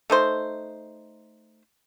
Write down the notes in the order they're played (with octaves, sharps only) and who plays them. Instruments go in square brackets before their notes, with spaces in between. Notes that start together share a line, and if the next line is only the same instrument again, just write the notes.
[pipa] A3 D#4 C5